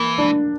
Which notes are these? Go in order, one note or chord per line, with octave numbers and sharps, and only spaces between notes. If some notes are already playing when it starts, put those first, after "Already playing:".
Already playing: E3 A#3
D4